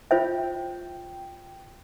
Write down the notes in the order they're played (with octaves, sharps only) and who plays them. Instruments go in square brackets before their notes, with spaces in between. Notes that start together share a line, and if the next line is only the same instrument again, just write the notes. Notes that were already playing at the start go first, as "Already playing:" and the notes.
[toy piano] F4 C5 E5 [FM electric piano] G5